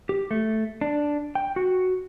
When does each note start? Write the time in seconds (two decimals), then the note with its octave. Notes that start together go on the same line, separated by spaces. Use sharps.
0.09 G4
0.31 A3
0.81 D4
1.35 G5
1.56 F#4